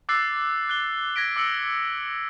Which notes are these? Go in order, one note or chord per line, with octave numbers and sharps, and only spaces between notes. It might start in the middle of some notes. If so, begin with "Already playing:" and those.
D6 E6 F#6 A6 C7
F#6 G7
G#6 A#6 B6 D7
D6 E6 C#7 D7 F#7